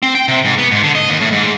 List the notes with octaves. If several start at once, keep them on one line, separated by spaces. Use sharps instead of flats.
C4
G5
C3
G#2
B3
G#2
D3
D#5
D#2
A2
G#2